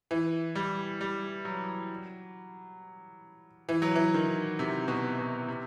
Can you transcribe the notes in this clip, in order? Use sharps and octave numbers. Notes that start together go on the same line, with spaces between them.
E3
G3
G3
F#3
E3
F#3
E3
D#3
C3
B2
B2
C3